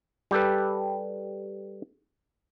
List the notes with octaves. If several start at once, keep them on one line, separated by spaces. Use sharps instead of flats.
G3 G4 A4 B4